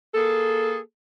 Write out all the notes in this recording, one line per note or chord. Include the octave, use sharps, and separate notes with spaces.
A#3 G#4 A4